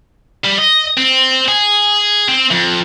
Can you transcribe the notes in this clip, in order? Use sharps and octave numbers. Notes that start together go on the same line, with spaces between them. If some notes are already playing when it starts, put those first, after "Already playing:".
G3
D#5
C4
G#4
C4
F2